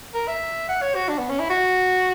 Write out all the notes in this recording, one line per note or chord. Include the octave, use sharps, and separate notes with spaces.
A#4
E5
F#5
C#5
F#4
D4
B3
C#4
E4
F#4